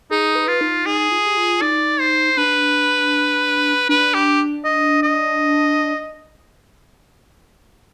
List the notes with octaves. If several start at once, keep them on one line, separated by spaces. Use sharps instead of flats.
D#4 G#4
B4
F4
D#4
D#4 G#4
F4
G4
F4
D#4 D5
C5
D4 B4
D4 B4
G4
D#5
D#5